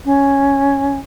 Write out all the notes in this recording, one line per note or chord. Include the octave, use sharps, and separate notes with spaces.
C#4